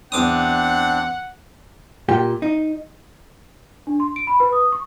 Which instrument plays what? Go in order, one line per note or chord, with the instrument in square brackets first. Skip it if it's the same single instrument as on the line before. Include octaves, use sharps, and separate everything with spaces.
[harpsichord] E2 D6 D#6 [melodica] C4 D4 [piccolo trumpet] F#5
[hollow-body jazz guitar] A#2 G4 G5
D#4
[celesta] D4
C6
D7
B5
B4
D#6
C#6